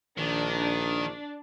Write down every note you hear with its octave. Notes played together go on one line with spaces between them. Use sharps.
A#1 D#3 D4